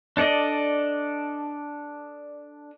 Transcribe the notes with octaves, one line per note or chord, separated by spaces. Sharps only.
D4 A4 D5 D#5